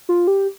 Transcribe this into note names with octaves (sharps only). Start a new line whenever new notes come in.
F4
G4